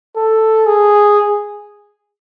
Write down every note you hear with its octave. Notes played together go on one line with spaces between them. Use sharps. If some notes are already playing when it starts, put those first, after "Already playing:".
A4
G#4